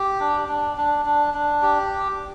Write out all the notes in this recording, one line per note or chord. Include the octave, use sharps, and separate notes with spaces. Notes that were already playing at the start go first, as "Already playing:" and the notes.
Already playing: G4
D4
D4
D4
D4
D4
G4